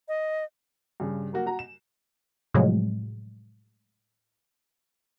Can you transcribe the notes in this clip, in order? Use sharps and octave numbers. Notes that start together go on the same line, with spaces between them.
D#5
G2 C#3
F#3 A#3 F#4
F#4 A#5
E7
A2 C3 F3 F#3 G#3